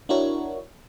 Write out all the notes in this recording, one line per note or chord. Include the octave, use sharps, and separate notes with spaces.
D4 E4 F#4 A#4 C#5